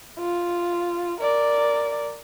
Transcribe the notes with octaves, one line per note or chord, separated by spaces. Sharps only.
F4
A#4 D5